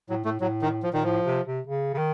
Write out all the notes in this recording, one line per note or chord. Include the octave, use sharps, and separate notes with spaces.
A2 F#3
A2 A3
A2 F#3
D#3
F3
A#2 D#3
A2 F3
C3
C3
C#3
C#3
D#3